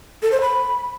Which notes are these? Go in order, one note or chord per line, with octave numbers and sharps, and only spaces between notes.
A4
C5
B5